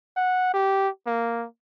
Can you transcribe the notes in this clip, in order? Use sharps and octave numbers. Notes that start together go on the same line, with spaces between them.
F#5
G4
A#3